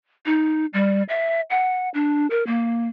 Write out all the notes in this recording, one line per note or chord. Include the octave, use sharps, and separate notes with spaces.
D#4
G3
E5
F#5
D4
A#4
A#3